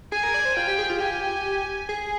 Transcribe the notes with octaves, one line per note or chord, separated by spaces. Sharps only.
G#4 G#5
A#4
D5
C5
F4 G5
G4
G#4
F4
G4 G#5
G#4